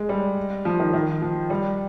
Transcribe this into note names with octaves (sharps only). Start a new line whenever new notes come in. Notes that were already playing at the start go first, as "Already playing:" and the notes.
Already playing: G#3
G3
F3
D#3
D#3
F3
G3